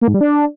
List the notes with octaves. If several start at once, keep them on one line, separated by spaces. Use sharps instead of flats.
A#3
G#2
G3
D4